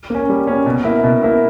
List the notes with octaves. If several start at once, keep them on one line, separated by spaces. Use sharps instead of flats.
A#3 C#4
G3
A#3 C#4
B2
A#3 E4
B2
A#3 E4